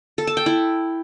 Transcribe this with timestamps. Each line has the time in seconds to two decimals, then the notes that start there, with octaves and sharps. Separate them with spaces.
0.18 A4
0.27 A5
0.37 G5
0.46 E4